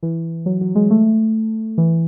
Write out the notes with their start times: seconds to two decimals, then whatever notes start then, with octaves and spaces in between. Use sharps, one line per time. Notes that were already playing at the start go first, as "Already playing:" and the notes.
0.03 E3
0.46 F#3
0.61 F#3
0.75 G#3
0.90 A3
1.78 E3